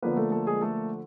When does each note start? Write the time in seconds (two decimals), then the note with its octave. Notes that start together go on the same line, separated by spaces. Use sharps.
0.02 D3 F3 A#3 B3 B4
0.17 A3 A4
0.32 A3 A4
0.47 G#3 G#4
0.61 A3 A4